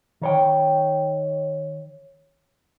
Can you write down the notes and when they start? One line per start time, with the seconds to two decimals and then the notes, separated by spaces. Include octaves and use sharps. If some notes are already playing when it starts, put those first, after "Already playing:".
0.21 D#3 C#5 G5